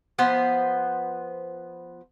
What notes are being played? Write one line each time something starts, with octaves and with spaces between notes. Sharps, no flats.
F3 B3 B4 C5